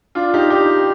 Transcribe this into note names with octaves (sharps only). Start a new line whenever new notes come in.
D4 F4
D#4 G4
D#4 G4